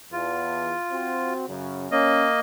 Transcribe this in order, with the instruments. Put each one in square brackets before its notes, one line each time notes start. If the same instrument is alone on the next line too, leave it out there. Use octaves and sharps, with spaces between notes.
[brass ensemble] E2 [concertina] F4
[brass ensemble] C4 F#4
F#2 C#3
[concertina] A#3 D#5 [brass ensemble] C#4